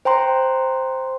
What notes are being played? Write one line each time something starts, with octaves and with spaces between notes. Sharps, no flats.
C5 G5 A#5 C6